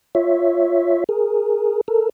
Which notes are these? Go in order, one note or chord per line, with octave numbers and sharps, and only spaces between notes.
F4 C#5 E5
G#4 A#4
A4 A#4